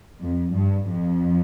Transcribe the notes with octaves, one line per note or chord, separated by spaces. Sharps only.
F2
G2
F2